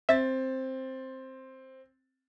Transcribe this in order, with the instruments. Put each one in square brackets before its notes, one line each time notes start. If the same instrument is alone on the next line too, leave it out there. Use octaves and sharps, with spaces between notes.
[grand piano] C4 A6 [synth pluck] E5